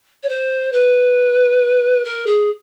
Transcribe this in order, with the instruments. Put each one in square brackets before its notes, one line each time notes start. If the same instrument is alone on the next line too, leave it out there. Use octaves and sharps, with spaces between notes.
[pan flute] C#5
C5
B4
A#4
G#4